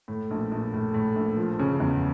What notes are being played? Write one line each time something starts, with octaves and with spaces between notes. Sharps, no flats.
A2
A#1
A#1
A2
A2
A#1
F3
C#3
E2